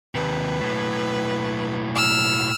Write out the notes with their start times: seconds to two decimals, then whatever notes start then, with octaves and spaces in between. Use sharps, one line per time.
0.15 D#2 C3 B4
0.61 B1 A2
1.95 E6 F6